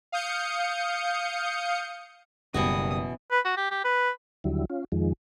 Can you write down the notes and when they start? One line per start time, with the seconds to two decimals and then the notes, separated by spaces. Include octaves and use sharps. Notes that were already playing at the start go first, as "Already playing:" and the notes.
0.12 F5 D#6 G6 C#7
2.54 F#1 B2 E3 G3 F#4 D#6
3.31 B4
3.45 F#4
3.57 G4
3.71 G4
3.84 B4
4.44 D#2 D3 F#3 G3 E4
4.70 C#4 F4
4.92 F2 D#3 F3 G#3